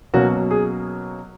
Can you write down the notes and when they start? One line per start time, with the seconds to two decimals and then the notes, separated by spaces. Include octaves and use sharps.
0.13 B2 F#3 A#3 C#4 F#4
0.51 G#4